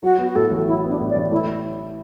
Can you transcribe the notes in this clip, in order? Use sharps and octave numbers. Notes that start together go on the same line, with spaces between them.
F#3 F#4
B3
F#4
A2 A4
A1
F#3 E4
B3
D4
A2
D5
A1
A3 E4
E4